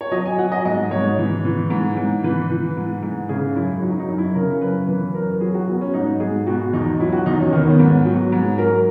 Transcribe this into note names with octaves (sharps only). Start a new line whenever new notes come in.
C#5
F#3 D#5
G#5
F#3 F#5
D#5
G#2 D#5
G#2 C#5
E3
E3
G#2
G#2
E3 B4
E3
G#2
G#2
C#3 G#4
F#2 E4
F#3 D#4
D#4
F#2
E4
C#3 A#4
F#2 B4
E3 B4
F#2 A#4
F#3 G#4
F#4
F#3 B3
C#4
G#2 D#4
G#2 G#4
B2 F#4
E2 D#4
F#3 E4
F#4
E2 D#4
C#4
D#3 B3
C#4
B3
G#2
F#3
G#2
F#3 A#4